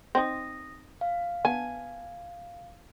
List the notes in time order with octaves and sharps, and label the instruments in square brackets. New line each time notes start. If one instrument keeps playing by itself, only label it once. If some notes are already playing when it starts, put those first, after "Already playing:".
[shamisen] C4 D#4 [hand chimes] D#6 A#6
[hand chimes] F5
[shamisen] B3 [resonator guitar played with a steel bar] G#5